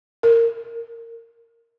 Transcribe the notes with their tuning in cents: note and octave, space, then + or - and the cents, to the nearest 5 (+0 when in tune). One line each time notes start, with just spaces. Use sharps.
A#4 -20